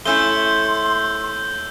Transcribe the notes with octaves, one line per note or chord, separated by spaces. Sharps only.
A3 C#4 E4 C6 E6 G6 G7